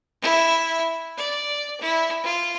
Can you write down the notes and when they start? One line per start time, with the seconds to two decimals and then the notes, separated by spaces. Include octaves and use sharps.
0.22 E4
1.17 D5
1.81 E4
2.24 F4